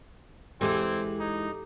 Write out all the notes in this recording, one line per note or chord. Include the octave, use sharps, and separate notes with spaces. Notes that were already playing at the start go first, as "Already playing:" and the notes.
E2 E3 G#3 C4 G4 A4 D6
D#4